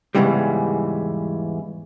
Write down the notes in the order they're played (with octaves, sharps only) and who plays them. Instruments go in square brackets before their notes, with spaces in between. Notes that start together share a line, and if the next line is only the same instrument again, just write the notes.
[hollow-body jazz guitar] E2 G#2 C#3 E3 G3